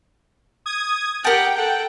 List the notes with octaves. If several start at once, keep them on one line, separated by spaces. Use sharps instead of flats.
D#6 G#6
G4 A#4 F#5 G5 A5
A4 F#5